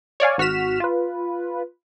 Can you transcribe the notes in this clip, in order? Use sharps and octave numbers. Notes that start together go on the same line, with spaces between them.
C#5 D5 F5 G#5
G#1 F#4 F6 B6 E7
F4 B4